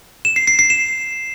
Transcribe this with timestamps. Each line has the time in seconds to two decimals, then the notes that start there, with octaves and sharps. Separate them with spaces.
0.25 E7
0.36 C7
0.48 C7
0.59 C7
0.70 E7